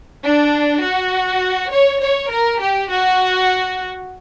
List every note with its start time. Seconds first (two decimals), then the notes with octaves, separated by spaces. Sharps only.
0.24 D4
0.82 F#4
1.70 C#5
2.00 C#5
2.30 A#4
2.59 G4
2.90 F#4